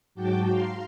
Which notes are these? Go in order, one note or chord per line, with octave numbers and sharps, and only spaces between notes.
G#2 F#3 F#4 G5 A5 D6
F5 A#5 C6